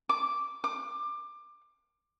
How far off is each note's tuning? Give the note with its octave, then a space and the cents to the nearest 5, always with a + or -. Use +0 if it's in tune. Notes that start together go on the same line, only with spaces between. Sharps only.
D6 -5
D6 +20